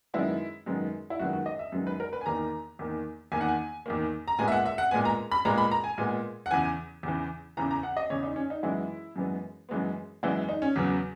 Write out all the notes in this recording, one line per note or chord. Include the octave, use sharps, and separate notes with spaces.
F#2 D#3 G#3 B3 E4
F#2 D#3 G#3 B3
E4
F#2 D#3 G#3 B3 F#4
F#4
D#5
E5
F#2 D#3 G#3 B3
B4
A#4
B4
G#5
E2 D#3 A#3 A#5
E2 D#3 A#3
E2 D#3 A#3 G#5
F#5
G#5
E2 D#3 A#3
A#5
A#2 G#3 B3 G#5
E5
F#5
E5
F#5
A#2 G#3 B3 G#5
A#5
B5
A#2 G#3 B3 A#5
B5
A#5
G#5
A#2 G#3 B3
F#5
E2 C#3 E3 G#5
E2 C#3 E3
E2 C#3 E3 A#5
A#5
F#5
D#5
E2 C#3 E3 C#5
D#4
C#4
D#4
F#2 E3 G#3 B3 E4
F#2 E3 G#3 B3
F#2 E3 G#3 B3
F#2 E3 G#3 B3 E4
D#4
C#4
E2 C#3 F#3 B3